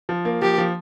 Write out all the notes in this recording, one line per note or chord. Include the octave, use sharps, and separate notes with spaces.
F3
A#3
F3 G4
F3